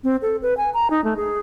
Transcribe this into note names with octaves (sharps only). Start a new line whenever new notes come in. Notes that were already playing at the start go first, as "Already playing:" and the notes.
C4
A4
B4
G#5
A#5
D#4
A3
G#4